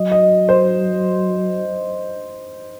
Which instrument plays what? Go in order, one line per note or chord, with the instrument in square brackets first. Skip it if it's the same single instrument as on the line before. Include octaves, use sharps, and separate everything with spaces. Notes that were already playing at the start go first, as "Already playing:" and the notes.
Already playing: [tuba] F#3 [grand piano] D#5
[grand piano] D#5
C5